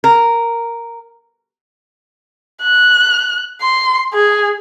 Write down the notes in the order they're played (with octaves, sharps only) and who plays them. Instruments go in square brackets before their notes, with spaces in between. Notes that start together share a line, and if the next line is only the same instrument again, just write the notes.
[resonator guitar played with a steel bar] A#4
[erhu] F#6
C6
G#4